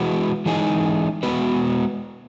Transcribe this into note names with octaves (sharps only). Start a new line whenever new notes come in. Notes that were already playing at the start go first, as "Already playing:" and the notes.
Already playing: E3 G#3 F#4 B4
E3 G#3 D#4 G#4
G#3 B3 F#4 B4